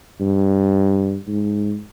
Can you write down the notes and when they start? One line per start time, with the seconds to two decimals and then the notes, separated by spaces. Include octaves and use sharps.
0.20 G2
1.27 G#2